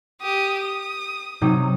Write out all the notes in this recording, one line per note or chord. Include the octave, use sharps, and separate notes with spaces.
G4 D#6
D#6
C3 F#3 D#4